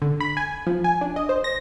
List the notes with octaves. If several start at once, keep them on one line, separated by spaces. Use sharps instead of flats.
D3
B5
G#5
F3
G#5
D4
D#5
C5
A#6